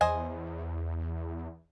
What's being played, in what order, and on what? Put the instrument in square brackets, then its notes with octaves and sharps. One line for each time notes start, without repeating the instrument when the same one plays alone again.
[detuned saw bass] E2 [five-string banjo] C5 D#5 G#5